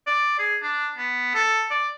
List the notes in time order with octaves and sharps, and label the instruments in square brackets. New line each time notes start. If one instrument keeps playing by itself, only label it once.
[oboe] D5
G#4
D4
B3
A4
D5